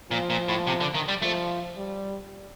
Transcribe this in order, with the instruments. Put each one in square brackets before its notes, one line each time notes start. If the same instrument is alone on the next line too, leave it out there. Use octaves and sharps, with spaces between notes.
[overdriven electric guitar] A#2 [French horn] F3
[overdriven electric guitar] A#2
A2
C3
D3
D#3
G3
[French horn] F3 [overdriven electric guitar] A3
[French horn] G3